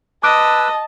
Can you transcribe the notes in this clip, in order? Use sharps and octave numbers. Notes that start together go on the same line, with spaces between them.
B4 D#5 A5 D6 E6 F#6 D7